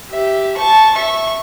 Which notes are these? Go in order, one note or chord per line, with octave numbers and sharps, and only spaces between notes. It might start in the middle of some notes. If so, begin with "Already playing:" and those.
G4 E5
A5 C#6
E5 C#6